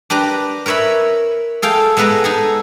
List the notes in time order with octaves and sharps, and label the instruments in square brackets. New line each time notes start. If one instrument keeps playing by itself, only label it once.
[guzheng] D4 G4 B4 A#5
A#4 B4 C#5 E5 B5
G#4 A4 F5 G5
G#3 B3 A4 B4 A#5
D#4 G#4 A4